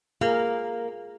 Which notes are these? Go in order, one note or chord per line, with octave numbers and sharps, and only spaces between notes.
A#3 F4 G#4 A#4